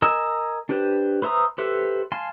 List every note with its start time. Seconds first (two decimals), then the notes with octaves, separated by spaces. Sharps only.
0.02 A#4 D#5 G#5 E6
0.69 D4 G4 B4 C5
1.22 B4 C5 E5 A#5 D#6
1.58 G4 A4 B4 C5 E5
2.12 F5 G#5 A5 C6